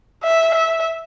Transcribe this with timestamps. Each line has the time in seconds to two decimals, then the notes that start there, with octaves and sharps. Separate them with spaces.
0.23 E5
0.54 E5